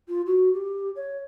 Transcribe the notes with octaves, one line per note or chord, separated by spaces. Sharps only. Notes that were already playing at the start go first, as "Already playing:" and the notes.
F4
F#4
G4
C#5